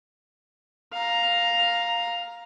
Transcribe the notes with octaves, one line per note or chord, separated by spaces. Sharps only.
F5 A#5